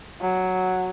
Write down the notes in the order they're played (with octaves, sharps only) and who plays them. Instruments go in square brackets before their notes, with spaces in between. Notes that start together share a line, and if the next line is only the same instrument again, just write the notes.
[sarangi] F#3